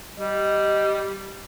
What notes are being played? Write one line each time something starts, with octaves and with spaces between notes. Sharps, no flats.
G3 D#5